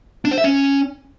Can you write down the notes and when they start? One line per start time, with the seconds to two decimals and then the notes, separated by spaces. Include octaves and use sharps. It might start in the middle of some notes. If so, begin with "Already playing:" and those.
0.25 D4
0.31 C5
0.38 E5
0.44 C#4